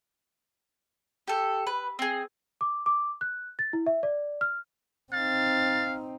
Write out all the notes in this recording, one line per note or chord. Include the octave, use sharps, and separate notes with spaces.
G4 A4
B4
C4 G#4
D6
D6
F#6
A6
E4
E5
D5
F6
C4 D#4 F5 A6